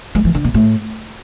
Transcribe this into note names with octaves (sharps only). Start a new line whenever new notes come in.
G#3
E3
D3
A#2
A2